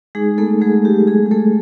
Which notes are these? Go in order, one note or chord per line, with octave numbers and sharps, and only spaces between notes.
G#3 D#4 G#4
A3 B3 A4
F#3 G#3 G#4
F#3 G4
G#3 A3 G#4
G#4
A3 D4 A4